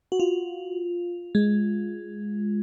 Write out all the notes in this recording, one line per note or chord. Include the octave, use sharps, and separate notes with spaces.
F#4
F4
G#3